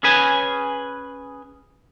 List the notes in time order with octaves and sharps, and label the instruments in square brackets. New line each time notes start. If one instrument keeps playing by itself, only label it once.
[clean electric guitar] C#4 G#4 B4 G#5